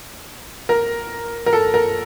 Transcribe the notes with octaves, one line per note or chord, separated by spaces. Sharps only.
A#4
A#4
A4
A#4